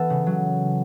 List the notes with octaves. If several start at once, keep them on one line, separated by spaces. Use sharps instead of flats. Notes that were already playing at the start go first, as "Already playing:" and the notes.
Already playing: E3 B3 A4
C#3
F#3